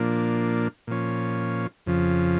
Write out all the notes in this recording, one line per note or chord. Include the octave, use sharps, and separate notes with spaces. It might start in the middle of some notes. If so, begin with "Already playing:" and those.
Already playing: A#2 F3 A#3 D4
A#2 F3 C#4
F2 C#3 F3